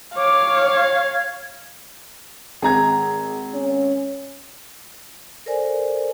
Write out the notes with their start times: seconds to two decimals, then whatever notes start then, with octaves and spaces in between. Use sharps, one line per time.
0.17 C#5 F5 D6
0.72 G#6
2.62 G#1 G#4 A#5 G#6
3.55 C#4
5.46 A4 A#4 C5 D5 G#5